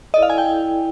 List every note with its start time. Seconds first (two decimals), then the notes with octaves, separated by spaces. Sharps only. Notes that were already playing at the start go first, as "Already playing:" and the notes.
0.14 E4 A4 D5 D#5
0.23 F5
0.30 G#5
0.38 G5
0.46 E4 A4 D5